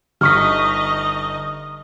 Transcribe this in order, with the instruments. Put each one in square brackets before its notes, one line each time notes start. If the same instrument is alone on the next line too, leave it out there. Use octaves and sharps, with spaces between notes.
[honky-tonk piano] G1 C#6 B6 [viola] D#4 D#5 [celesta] F6